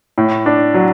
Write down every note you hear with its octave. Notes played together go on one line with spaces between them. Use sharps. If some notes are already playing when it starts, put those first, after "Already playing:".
A2
D4
F#3